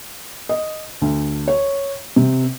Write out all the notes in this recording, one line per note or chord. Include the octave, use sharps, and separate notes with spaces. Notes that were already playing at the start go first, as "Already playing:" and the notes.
D#5
D2
C#5
C3